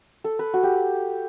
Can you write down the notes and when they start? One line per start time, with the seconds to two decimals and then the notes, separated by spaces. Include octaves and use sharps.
0.24 A4
0.39 B4
0.54 F#4
0.63 G4